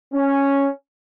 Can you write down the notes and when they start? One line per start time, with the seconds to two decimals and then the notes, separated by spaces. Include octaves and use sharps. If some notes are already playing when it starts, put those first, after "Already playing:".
0.13 C#4